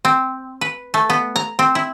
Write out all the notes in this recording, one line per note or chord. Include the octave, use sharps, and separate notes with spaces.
C4
B4
A3
B3
A#5
C4
E4